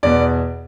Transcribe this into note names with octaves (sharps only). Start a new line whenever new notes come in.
E2 B2 B3 D5